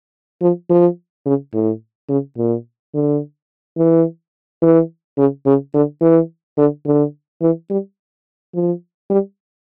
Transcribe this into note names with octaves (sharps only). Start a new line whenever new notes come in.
F3
F3
C#3
A2
C#3
A#2
D3
E3
E3
C#3
C#3
D3
E3
D3
D3
E3
G3
F3
G3